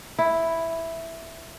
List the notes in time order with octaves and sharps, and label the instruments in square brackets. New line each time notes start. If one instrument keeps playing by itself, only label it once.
[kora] E4